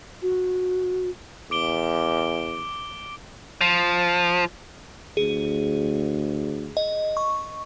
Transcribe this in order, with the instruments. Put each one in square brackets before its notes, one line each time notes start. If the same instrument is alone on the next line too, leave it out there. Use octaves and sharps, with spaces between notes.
[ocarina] F#4
[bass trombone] E2 [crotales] D6 D7 G7
[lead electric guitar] F3
[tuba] D2 [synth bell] G#4
[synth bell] D#5
C#6